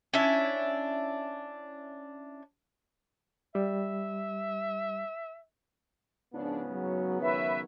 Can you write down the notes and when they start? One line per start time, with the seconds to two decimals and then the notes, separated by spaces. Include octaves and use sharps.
0.13 C#4 D4 E4 E5
3.55 G3 E5
6.34 G#2 C#3 F3 B3 D4
6.70 F#3
7.21 D#3 F#3 B4 C#5 E5